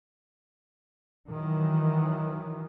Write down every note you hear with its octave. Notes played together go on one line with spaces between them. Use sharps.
D#3 E3 F#3